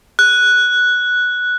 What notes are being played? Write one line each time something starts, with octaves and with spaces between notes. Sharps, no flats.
F#6